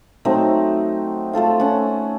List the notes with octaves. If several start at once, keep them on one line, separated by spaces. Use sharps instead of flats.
F#3 A3 C4 D#4
A3 F4 A4 F5
C#4 F#5